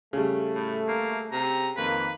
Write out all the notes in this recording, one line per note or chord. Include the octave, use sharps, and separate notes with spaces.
C#3 G3 A3
A2
A#3
C3 A#5
F2 D#3 A#3 B4